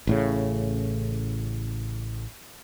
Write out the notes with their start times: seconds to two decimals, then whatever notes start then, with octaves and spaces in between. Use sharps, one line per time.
0.07 A1 A2 C#3